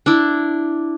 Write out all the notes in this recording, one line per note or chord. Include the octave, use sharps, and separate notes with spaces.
D4 E4